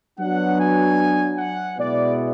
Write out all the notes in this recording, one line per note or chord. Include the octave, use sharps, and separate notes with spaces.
F#3 B3 D4 F#5
G#5
F#5
B2 G#3 B3 E4 D5